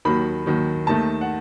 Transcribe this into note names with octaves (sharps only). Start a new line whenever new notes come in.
D#2 D#3 F#3 B5
D#2 D#3 F#3
D#2 D#3 A3 A5
F#5